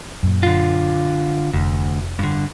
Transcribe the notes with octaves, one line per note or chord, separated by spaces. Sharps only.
F#2 A#2
D3 F4
F1 D2
G2 D3